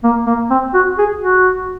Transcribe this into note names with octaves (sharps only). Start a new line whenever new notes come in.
A#3
A#3
C4
F#4
G#4
F#4